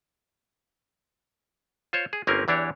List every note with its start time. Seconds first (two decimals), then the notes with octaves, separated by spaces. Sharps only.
1.93 F4 C5 C#5
2.13 G#4
2.27 G1 A#3 C4 C#4 A#4 G#5
2.48 E2 E3 D4 G4 C#5